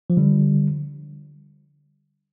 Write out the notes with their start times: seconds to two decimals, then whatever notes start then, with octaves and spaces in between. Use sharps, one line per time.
0.10 F3
0.17 D3 G3